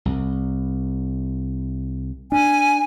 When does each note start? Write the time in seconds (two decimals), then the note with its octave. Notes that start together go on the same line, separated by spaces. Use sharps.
0.05 C2
2.32 D4 G#5